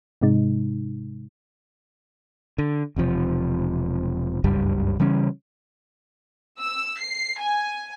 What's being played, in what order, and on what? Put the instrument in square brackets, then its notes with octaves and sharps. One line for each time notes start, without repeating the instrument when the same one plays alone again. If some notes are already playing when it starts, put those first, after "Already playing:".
[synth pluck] G#2 C3 G#3 D#4
[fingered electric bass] D3
E1 C3 F3
F#1 C#2 G2 G3
C#3 E3 G3 C#4
[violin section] E6
C7
G#5